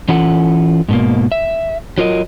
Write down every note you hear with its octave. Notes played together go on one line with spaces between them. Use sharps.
E3 C#4 F4 A4 F#5
G#2 B2 A#3
E5
F#3 F4 A#4 D#5